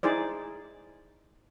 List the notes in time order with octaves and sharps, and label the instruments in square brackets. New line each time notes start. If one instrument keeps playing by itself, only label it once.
[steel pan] D#4 E4 G#4 C5 D5